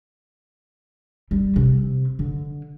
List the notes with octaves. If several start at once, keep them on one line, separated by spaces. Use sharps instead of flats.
G3
C3
D3